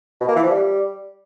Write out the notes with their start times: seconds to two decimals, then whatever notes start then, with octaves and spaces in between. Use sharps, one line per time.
0.21 B2
0.28 A#3
0.36 E3
0.43 F3
0.51 G3